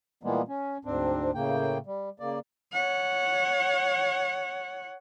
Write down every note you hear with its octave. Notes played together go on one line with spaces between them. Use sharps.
A#2 E3 G3 G#3 A#3 B3
C#4
D2 G#2 C4 D4
A2 C#3 A#3 G5
G3
C#3 A#3 D5
C#5 F#5